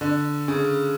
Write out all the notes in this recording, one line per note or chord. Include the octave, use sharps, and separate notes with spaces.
D3
C#3